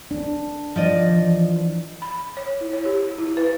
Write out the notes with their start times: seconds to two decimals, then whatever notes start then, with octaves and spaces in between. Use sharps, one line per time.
0.11 D4
0.76 F3 D5 D#5
1.09 E3
2.02 B5
2.37 C#5
2.61 E4
2.73 C#5
2.85 G4
3.18 E4
3.37 B4